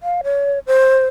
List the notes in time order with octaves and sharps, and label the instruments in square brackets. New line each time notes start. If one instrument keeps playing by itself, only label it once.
[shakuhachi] F5
C#5
C5